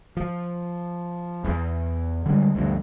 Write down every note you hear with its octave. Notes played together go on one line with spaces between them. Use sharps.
F3
E2
D3 G3 G#3
D2 G2 F3